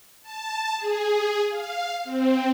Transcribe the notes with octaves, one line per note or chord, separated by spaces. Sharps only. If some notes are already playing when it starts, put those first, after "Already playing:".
A5
G#4
F5
C4